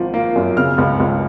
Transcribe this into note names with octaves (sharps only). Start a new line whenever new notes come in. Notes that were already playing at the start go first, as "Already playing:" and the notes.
Already playing: G#1 F3
A#3
F#2
C#3 F6
C#2
C#2